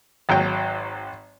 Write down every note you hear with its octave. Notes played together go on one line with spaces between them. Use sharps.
G#1 F#3 G5